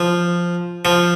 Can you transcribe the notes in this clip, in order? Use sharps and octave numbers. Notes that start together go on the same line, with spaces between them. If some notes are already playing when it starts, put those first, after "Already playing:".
Already playing: F3
F3